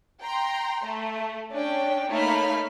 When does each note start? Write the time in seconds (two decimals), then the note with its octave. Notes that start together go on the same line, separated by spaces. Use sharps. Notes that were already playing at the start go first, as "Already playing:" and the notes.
0.21 G5 A#5 C6
0.86 A3
1.51 C#4 D4 G5
2.10 A3 A#3 D#4 C#5 B5 F6